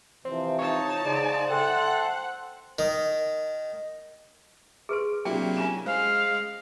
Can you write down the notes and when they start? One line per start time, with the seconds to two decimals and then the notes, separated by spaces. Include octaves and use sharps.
0.25 C3 E3 F3 C4
0.59 D#4 C#5 A5
1.05 G#2 C#3 C5 D5
1.50 A4 E5 F#5 G5 C6
2.79 D#3
4.89 G#4 B4 C6 C#6 D7
5.25 C3 F#3 A#3 D4 E4 G4 G5
5.57 C#4 D4 F4 G#5 E7
5.86 G#3 C5 F5